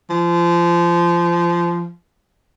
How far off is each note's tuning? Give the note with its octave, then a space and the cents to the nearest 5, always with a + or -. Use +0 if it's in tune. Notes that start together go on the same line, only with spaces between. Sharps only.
F3 -25